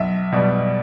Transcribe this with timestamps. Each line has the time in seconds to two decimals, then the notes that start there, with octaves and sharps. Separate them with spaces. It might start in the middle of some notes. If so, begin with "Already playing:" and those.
Already playing: B1 E5
0.32 B2 G3 D5